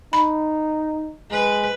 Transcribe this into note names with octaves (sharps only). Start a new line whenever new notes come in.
D#4 B5
G#3 B4